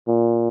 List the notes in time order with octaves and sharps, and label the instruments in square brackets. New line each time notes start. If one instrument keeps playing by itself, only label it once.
[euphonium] A#2